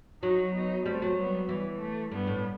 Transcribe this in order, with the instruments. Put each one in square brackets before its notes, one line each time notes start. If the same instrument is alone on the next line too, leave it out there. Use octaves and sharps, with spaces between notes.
[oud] F#3 [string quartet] D#4 F#4
[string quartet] B3 D#4
[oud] G3 [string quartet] A3 C4
[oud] F#3
[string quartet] G3 B3
[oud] E3 [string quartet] G3
[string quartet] A3
[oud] G2 [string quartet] G3 B3
[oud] A2